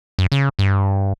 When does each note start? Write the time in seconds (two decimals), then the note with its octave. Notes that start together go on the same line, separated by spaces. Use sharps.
0.19 F#2
0.32 C#3
0.59 G2